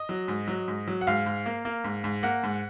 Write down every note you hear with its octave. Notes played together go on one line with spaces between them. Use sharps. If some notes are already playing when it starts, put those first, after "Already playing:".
Already playing: D#5
F#3
G#2
F#3
G#2
F#3
F#5
G#2 F5
G#2
A#3
A#3
G#2
G#2
A#3 F#5
G#2